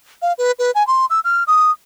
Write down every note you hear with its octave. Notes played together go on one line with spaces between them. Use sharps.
F5
B4
B4
G#5
C6
E6
F6
D#6